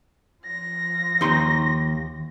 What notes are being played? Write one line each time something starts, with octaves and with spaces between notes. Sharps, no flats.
F3 A#6
D#2 D#4 C6